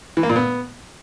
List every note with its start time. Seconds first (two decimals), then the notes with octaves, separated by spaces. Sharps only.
0.17 E3
0.23 A#3
0.29 A#2
0.36 B3